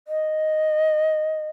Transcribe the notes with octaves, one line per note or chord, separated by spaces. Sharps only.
D#5